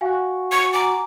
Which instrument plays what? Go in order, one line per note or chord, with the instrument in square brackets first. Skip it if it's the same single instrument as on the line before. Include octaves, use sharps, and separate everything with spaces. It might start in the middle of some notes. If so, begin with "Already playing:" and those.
[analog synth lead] F#4 [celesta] F5 G5 G#5
[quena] C#6
[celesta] G#5 A#5 [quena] D6